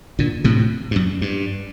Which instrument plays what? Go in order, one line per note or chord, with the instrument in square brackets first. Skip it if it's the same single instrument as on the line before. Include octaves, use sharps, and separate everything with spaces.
[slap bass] A#2 D3
A2 C3
G2
F#2
G2